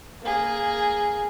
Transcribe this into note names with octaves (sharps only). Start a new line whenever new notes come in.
A#3 G#4